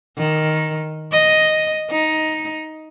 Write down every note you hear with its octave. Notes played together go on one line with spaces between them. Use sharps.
D#3
D#5
D#4